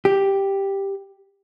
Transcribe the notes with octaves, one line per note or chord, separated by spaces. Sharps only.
G4